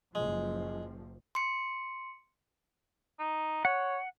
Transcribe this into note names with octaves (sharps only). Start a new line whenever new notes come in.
F#1 A#2 F3 G#3
C6 C#7
D#4
C#5 F#5